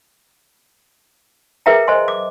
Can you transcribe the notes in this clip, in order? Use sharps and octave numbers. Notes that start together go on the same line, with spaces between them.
G#4 A#4 B4 E5 G5 A#5
C5 D#5 G#5 C6
D6